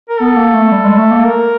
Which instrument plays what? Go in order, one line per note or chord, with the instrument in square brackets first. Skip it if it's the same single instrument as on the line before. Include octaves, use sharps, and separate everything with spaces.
[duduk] A#4
[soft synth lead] B3 [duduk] A4
[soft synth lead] A#3
A3
G3
G#3
A3
A#3
[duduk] A#4